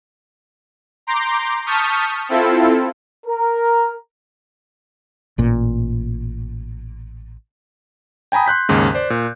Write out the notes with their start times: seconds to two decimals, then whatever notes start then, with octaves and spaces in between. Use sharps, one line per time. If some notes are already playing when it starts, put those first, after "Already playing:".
1.07 A#5 C6 D6 G6
1.66 A5 C#6 D#6 F6 G6 B6
2.29 C4 E4 F4 A4
3.27 A#4
5.38 A1 A#2
8.32 G5 G#5 A#5 B5 D#6
8.46 C6 F#6 G6 B6
8.69 D#2 G#2 C#3
8.95 C5 D5
9.10 A#2